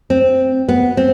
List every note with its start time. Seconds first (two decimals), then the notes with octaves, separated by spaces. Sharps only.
0.10 C4
0.69 B3
0.97 C4